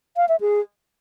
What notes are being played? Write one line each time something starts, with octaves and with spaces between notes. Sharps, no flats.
F5
E5
G#4